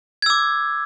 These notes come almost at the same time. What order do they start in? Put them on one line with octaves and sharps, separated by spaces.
G#6 E6 D6